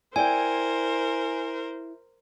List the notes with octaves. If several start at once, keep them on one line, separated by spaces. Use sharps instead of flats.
E4 A#4 C5 D5 G5 G#5